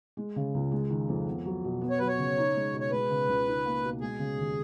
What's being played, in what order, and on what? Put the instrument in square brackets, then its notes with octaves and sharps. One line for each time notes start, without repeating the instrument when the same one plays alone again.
[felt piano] G#3
C#3
C#2
G#3
D#3
F2
B3
F#3
B2
B3
[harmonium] C#5
[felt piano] F#3 [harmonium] B4
[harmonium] C#5
[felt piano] C#3
D#4
G#3
B2
[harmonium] C#5
[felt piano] G#3 [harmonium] B4
[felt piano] C#3
C#2
D#4
A#3
B2
[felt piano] G#3 [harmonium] G#4
[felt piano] C#3
D#2